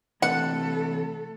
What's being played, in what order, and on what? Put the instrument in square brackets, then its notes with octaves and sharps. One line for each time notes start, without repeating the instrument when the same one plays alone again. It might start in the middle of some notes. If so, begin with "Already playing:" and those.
[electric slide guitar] C3 E3 [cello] A3 A4 [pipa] F#5